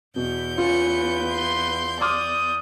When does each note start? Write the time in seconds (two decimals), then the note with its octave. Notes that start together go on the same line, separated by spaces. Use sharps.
0.16 E2 B2 G6
0.58 C#4 F4 B4 C#7
1.31 C6
2.01 D5 C6 D6 D#6 F6